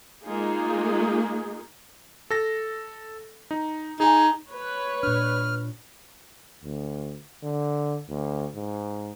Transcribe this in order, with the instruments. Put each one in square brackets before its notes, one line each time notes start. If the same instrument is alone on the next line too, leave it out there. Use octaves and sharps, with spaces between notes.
[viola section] G#3 A#3 D#4 F4 G#4
[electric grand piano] A4 A#6
D#4
[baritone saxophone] D#4 [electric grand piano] G#4 G#5
[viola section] B4 C#5
[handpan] A#2 D4 [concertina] F6
[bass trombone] D2
D3
D2
G#2